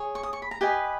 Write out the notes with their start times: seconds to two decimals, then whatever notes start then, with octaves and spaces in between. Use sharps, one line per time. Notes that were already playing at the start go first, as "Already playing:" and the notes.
Already playing: G#4 C#5
0.15 C#6
0.23 D#6
0.33 C#6
0.42 B5
0.51 A#5
0.61 G4 B4 D#5 G#5